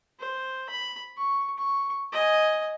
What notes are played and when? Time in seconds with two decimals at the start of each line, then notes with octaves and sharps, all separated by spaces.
0.19 C5
0.69 B5
1.17 C#6
1.58 C#6
2.13 D#5 G#5